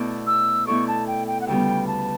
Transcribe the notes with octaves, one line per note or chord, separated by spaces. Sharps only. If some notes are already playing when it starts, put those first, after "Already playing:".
Already playing: B2 A3 E4 A4 D5
E6
B2 A3 E4 A4 D5 C#6
A5
G5
G5
F#5
D2 C#3 G3 B3 G5
A5